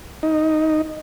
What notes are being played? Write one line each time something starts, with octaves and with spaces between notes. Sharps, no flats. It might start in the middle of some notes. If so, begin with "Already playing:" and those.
D#4